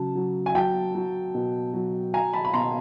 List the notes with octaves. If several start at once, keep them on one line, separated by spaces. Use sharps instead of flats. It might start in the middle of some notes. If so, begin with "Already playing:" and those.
Already playing: C#3 F#3 A5
F#3
G#5
F#3 G5 A5
F#3
B2
F#3
F#3 G#5 A#5
A5 B5
B5
B2 A#5 C6